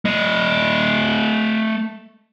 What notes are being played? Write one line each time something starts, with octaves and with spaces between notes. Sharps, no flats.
A3 D#5